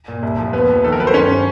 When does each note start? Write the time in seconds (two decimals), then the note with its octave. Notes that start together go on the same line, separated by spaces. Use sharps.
0.08 A#2
0.23 C2
0.38 F3
0.53 D#2 B3 B4
0.68 F3
0.84 D#3 A4
0.92 A#4
0.99 F#3 B4
1.07 C5
1.14 G2 C#4 C#5